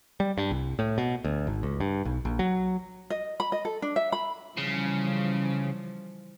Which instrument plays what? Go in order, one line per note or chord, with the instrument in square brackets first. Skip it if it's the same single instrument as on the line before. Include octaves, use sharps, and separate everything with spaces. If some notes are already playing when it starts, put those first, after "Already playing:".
[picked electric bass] G3
G2
C2
A2
B2
D2
G#1
C#2
G2
B1
A#1
F#3
[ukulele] D#5
B5
D#5
A4
D4
E5
B5
[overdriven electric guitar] C#3 [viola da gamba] E3 F3 G3